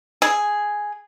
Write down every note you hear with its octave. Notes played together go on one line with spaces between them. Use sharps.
G#4